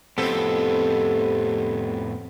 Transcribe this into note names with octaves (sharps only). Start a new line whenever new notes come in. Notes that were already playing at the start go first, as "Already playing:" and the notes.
F2 A2 C3 B3 C4 A4